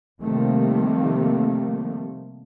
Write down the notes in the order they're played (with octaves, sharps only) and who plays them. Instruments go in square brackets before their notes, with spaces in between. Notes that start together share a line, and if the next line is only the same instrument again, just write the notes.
[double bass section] C3 D#3 F3 G3 A3 A#3